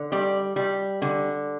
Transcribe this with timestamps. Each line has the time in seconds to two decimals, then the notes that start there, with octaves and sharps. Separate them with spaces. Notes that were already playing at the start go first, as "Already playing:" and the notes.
Already playing: D3
0.12 G3 D5
0.56 G3
1.02 D3